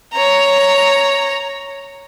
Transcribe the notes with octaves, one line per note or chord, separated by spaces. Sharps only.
C#5 A#5